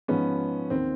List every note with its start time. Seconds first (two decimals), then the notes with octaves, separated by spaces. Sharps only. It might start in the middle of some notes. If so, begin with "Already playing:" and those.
0.08 G#2 F3 B3 C#4
0.70 D#2 D#3 C4